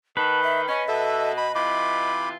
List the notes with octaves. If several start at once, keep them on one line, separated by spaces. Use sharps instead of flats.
D#3 B4 A5
E5
C#4 D#5
B2 A4 E5
B5
C3 E3 F4 B5 D6